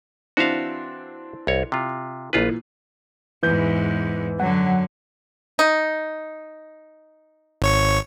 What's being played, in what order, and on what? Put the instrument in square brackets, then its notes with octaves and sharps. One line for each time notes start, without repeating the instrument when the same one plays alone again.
[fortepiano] E3 C4 D4 [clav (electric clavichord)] F#4 E5 F5
[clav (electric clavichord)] C2 C#5
C3 F4
[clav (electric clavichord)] A#1 F4 B4 [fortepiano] A#2 E3
[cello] E2 G#2 [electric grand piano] E3 B4 G6
[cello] F#2 D3 [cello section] F#3 [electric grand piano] F#5
[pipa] D#4
[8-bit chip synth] G#1 C#5 C#6